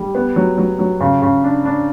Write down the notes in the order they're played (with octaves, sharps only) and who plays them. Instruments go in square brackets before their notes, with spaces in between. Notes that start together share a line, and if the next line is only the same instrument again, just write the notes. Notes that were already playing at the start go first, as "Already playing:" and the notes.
Already playing: [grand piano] G3
B3
F#3
F#3
F#3
C#3
C#3
D4
D4